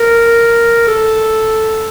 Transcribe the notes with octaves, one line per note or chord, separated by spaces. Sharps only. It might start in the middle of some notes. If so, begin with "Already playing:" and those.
Already playing: A#4
A4